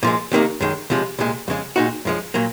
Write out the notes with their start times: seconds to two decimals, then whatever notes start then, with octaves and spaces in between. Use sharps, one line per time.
0.03 A#2 F3 G#3
0.32 C2 C3 D#3 A#3 D#4
0.60 F#2 D#3 G#3
0.90 C#2 C3 F3 G#3
1.19 C2 A#2 G#3
1.48 F2 C#3 G#3
1.76 A#2 G#3 D#4 F#4
2.05 F#2 F3 G#3
2.34 A#2 F#3 A#3